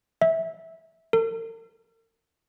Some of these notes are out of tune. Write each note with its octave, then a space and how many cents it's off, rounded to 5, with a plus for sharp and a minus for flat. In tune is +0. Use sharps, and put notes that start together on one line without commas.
E5 -15
A#4 -45